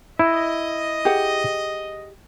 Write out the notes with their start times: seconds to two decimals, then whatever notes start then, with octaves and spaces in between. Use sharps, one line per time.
0.19 E4 D#5
1.05 G4 G#4 F#5